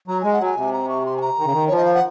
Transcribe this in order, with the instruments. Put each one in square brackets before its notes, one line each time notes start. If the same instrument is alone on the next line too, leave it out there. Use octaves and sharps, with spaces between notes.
[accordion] F#3 [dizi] A#5
[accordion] G#3 [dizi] G#5
[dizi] F#5
[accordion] F#3 [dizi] G#5
[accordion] C3
[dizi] A#5
C#6
C6
G#5
A#5
[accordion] D#3
C#3
D#3
[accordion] F3 [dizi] C#5
[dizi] D#5
F5
F#5